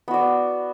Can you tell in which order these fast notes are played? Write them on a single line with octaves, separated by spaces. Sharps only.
B3 F#4 D5